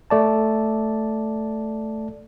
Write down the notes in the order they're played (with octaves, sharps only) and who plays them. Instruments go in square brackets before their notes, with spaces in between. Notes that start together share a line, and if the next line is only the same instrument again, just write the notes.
[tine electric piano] A3 D5 A5